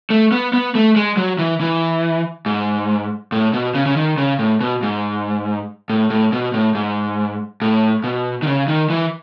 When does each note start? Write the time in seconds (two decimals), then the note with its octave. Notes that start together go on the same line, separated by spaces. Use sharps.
0.10 A3
0.32 B3
0.54 B3
0.75 A3
0.96 G#3
1.17 F#3
1.39 E3
1.61 E3
2.46 G#2
3.32 A2
3.53 B2
3.75 C#3
3.86 C#3
3.97 D#3
4.18 C#3
4.39 A2
4.61 B2
4.83 G#2
5.90 A2
6.10 A2
6.33 B2
6.54 A2
6.75 G#2
7.62 A2
8.04 B2
8.42 D#3
8.47 C#3
8.68 D#3
8.90 E3